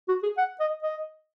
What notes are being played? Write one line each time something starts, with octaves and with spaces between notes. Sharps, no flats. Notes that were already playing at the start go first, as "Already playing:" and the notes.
F#4
G#4
F#5
D#5
D#5